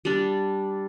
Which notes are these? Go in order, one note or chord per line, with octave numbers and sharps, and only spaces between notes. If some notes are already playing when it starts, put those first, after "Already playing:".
G3 D4